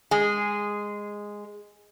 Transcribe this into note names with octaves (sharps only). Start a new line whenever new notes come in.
G#3 G#4